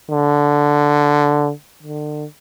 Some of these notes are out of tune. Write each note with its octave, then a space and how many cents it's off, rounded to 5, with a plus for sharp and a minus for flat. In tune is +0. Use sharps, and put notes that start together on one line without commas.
D3 -5
D3 +35